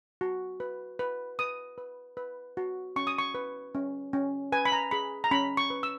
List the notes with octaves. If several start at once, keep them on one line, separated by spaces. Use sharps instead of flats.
F#4
B4
B4
B4 D#6
B4
B4
F#4
C#4 C#6
D#6
C#6
B4
C#4
C#4
B4 G#5
B5
A#5
G#4 B5
A#5
C#4 B5
C#6
B4
E6